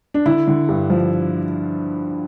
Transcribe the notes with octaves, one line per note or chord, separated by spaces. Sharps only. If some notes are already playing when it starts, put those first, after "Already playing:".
D4
D3 E4
D3
G2
F3